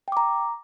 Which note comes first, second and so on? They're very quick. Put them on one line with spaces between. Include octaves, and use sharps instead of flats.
G5 D6 A#5